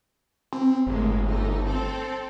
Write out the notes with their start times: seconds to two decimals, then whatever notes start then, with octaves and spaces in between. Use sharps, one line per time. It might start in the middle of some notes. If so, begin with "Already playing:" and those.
0.53 C4
0.87 G1 A2 G#3 A#3
1.28 A3 D#4
1.66 C4 A4